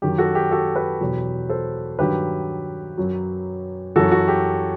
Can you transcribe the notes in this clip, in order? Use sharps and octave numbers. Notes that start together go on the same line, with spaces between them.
F#2 D#3 F#3 G4
F#4 A4
G4
F#4 A4
G4 B4
E2 B2 F#3
A4 C5
G2 D#3 F#3 G4 B4
F#2 F#3
F#2 E3 F#4 A4
F#4
G4